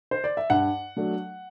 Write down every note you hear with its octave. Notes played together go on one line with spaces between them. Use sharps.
C5
D5
E5
G2 F#5
F#3 A3 D4